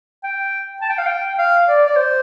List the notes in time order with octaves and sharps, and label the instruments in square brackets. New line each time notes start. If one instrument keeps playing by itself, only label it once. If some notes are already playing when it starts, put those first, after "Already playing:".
[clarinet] G5
A5
G5
F5
G5
F5
D5
D5
C5